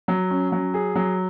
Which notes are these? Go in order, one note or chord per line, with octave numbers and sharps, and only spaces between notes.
F#3
C#4
F#3
G#4
F#3